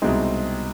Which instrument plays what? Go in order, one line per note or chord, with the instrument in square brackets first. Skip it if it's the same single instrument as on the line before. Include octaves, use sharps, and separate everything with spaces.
[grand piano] C2 B2 G#3 C4 D#4